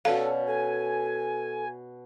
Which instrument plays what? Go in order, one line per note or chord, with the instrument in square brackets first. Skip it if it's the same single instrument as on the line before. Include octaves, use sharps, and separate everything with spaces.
[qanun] B2 C#4 B4 [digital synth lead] A4 [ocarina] D5 [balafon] F5
[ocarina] A4 [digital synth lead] G#5